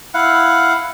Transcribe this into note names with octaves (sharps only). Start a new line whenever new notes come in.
E4 F5 F#5